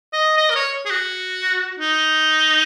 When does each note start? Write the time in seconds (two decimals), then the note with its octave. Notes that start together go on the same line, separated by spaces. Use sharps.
0.13 D#5
0.37 D#5
0.50 A#4
0.55 C#5
0.85 G#4
0.91 F#4
1.79 D#4